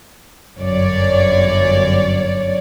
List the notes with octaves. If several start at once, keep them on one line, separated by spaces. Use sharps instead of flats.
G1 F#2 C#5 D5